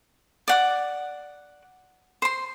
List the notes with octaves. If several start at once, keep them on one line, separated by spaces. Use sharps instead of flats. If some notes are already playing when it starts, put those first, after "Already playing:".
D5 F#5 D6
C5 C6